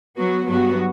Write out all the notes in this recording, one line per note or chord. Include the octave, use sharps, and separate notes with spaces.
F#3 B3 F#4
G2 F#3 B3 F#4